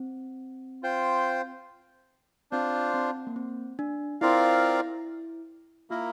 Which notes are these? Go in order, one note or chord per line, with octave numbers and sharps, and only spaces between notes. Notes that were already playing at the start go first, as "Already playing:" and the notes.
Already playing: C4
F4 C5 G5
C4 D4 F4 C5
C4
A#3
C4
D4
C4 E4 F4 A#4 D5 F5
A#3 E4 F4 A#4